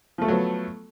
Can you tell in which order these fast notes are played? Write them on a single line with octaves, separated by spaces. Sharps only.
F3 A3 A4 F#3 B3